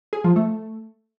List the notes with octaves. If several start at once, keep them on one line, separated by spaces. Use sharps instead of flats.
G#4
F3
A3